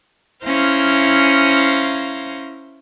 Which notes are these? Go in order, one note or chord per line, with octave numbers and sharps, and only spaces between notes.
C#4 E4 C5 F5 A#5